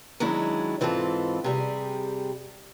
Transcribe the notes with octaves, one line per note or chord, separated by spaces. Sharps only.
D#3 F#3 G#3 C#4 D4 E4
G#2 E3 C4 F4 G4 A4
C3 G3 G#4